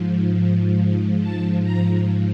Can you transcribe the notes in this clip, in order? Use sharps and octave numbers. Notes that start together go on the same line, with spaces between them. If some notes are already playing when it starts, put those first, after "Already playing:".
Already playing: G#2 F3
A5
A#5